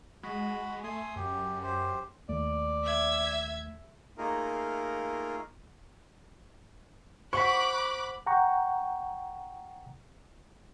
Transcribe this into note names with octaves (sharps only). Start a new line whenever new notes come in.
G#3 F#4 B5
A3 G#5 C6 D#6
F#2 G4
G4 C5
D#2 A3 D5
E5 G#6
A3 A#3 D#4 F4 G#4 A#4
C5 F#5 B5 C#6 D6 F#6 B6
F#5 G5 A#5 C#6